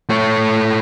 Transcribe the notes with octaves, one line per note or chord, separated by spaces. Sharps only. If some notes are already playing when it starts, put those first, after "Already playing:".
A3 C#5